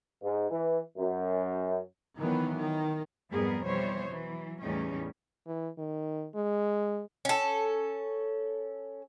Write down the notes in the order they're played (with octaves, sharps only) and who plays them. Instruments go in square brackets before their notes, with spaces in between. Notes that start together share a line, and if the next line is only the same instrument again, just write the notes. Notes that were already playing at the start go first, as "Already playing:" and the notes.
[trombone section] G#2
E3
F#2
[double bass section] D#3 E3 F#3 B3
D#3
[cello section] F2 G#2 G3 B3 G#4 A#4
B2 E3 G3 C5 C#5
E3 F#3
E2 A2 G3 C#4 D#4
[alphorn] E3
D#3
G#3
[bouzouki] C#4 A4